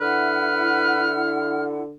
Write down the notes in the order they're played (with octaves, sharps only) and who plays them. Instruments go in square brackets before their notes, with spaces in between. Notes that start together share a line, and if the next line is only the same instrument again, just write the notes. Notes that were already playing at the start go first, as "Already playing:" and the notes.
[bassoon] D3 [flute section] E4 F#5 [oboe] B4 [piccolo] F6